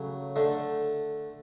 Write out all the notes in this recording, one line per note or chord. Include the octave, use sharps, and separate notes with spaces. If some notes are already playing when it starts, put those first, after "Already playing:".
Already playing: C#3 F#3 A3
D3 A3